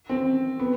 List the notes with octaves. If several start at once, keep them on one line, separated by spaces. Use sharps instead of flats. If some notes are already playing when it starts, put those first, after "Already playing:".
C4
B3